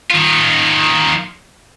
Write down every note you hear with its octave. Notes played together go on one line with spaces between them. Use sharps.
D#3 F4